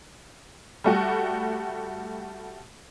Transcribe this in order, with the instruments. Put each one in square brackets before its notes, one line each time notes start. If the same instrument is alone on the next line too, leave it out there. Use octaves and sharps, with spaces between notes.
[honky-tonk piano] G3 A3 F#4 G4